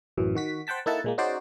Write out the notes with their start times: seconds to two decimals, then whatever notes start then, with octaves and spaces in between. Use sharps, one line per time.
0.17 A1 F#2 E3
0.35 D#3 F#4 B6
0.67 C5 F#5 G5 A5 B6
0.86 A#3 D#4 E4 A4 F#5 A5
1.04 A#2 G#3 A#3
1.18 C#4 D#4 F#4 G#4 C5 D5